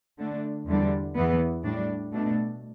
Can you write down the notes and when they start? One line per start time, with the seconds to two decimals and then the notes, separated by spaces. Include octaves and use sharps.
0.18 D3 A3 D4
0.67 E2 D3 G3 D4
1.15 E2 E3 B3
1.64 A2 G3 D4
2.12 B2 A3 D4